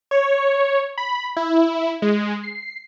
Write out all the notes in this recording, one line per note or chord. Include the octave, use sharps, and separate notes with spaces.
C#5
B5
E4
G#3
C7